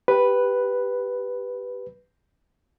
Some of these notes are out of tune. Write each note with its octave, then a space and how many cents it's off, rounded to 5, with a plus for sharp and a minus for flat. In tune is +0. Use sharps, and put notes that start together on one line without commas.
G4 +0 B4 +0